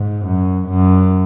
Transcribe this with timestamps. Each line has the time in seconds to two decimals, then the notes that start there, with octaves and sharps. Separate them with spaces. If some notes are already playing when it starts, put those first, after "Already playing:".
Already playing: G#2
0.26 F#2
0.69 F#2